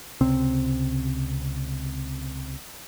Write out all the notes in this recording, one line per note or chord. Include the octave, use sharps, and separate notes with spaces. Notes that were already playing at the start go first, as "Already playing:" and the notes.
C#2 C3 C4